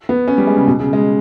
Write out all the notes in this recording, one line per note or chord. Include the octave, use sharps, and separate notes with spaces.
B3
C#4
G3
G#3
C#3
B2
C#3
G#3